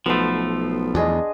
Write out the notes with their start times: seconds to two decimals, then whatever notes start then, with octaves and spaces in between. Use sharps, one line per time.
0.06 B1 F3 A3 B3 C6
0.95 E2 D4 G#4 D#5